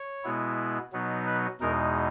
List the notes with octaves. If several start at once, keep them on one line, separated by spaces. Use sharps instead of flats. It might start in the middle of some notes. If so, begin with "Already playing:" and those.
Already playing: C#5
B2 G#3 B3 E4
B2 F#3 B3 D#4
B4
E2 B2 G#3 D#4 A#4